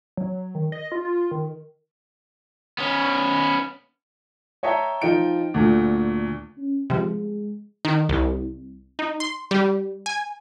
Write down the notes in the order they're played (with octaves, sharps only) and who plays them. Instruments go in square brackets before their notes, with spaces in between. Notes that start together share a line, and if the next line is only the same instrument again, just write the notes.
[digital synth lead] F#3
D#3
D#5
F4
F4
D#3
[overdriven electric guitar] B3 C#4
[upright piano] C#5 D#5 E5 G5 A5 A#5
F3 D#4 F4 G5 D7
D2 A#2
[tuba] C#4
[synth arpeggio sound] C3 F3 [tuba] G#3
[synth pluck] D#3
C2
D#4
C6
G3
G#5